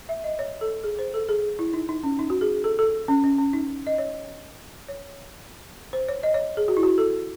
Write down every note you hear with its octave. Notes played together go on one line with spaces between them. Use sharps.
E5
D#5
C#5
A4
G#4
C5
A4
G#4
E4
D#4
D#4
C#4
D#4
F#4
G#4
A4
A4
C#4
C#4
C#4
D#4
D#5
C#5
C#5
C5
C#5
D#5
C#5
G#4
F#4
E4
F#4
A4